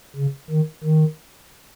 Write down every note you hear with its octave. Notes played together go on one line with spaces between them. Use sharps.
C#3
D#3
D#3